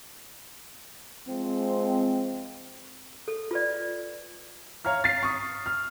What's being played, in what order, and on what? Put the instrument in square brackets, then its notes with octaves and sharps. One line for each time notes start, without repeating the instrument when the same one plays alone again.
[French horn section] F3 G#3 C4
[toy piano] A4
F4 B4 D5
[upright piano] C#5 F5 A#5 F6
A6 C7
C#6 D#6
F6